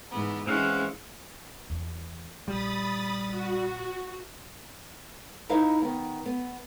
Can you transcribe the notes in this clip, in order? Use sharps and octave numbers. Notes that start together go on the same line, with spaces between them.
G#2 E3 B3
E3 G#3 C4 C#4 F5 F#5
E2
A#1 G3 B5 D#6 A6
F#4
D#4 E4 B4 D#5 F5
D#3 B3
B3